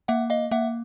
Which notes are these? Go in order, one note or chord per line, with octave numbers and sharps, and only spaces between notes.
A#3 E5 F#5
D#5 F5
A#3 E5 F#5